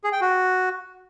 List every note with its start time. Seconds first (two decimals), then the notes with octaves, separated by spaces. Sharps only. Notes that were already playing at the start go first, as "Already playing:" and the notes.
0.04 G#4
0.13 G5
0.21 F#4